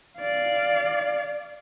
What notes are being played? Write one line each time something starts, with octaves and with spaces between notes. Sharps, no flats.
D5 F5